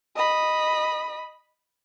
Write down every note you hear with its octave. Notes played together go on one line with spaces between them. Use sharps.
D#5 B5